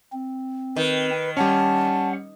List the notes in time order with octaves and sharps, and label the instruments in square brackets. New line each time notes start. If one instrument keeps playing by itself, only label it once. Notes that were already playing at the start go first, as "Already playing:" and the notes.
[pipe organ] C4
[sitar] D#3 [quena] B4
[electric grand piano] G3 C#4 [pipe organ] F#5 [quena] A5